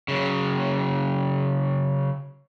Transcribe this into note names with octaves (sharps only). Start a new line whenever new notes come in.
C#3 F#3